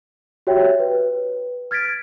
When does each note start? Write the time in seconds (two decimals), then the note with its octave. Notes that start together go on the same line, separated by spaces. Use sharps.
0.47 F#4 G4 C#5 E5 G5
0.80 B4
1.71 F6 G#6 A6 B6 D7